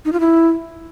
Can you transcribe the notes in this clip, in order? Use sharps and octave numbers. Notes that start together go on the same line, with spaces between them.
D#4
F4
E4